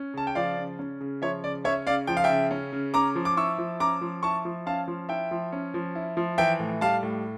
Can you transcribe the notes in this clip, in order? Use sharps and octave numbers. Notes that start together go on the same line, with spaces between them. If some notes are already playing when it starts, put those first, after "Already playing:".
Already playing: C#4
C#3 A5
G5
F3 D5 F5
C#3
C#4
C#3
F3 C#5 E5
C#3 D5
C#4 C#5 E5
C#3 D5 F5
F3 G5
F5
E5 G5
C#3
C#4
C#3
C#4 A#5 D6
F3
D6
E4 C#6 E6
F3
C#4 A#5 D6
F3
E4 A5 C#6
F3
C#4 F5 A5
F3
E4 E5 G5
F3
C#4
F3
E4
F3
E3 E5 G5
A2
G3 F5 A5
A2